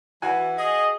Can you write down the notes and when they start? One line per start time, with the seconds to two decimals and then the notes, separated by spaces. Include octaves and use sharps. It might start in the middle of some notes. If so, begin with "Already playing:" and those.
0.22 E3 F#4 G#5
0.58 G#4 D#5